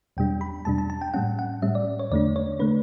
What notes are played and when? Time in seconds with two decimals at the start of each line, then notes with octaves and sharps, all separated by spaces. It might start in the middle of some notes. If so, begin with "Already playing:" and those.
0.17 E2 B2 G3 D4 G5
0.41 B5
0.65 E2 B2 G3 D4 A5
0.78 A5
0.90 A5
1.01 G5
1.14 A2 G3 C#4 F#5
1.39 F#5
1.62 A2 G3 C#4 E5
1.75 D5
1.99 C#5
2.11 E2 D3 A3 D4 D5
2.36 C#5
2.59 D3 A3 D4 B4